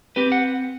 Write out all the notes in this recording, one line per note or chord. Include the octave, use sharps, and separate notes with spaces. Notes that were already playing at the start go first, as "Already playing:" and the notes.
C4 G4 B4
F#5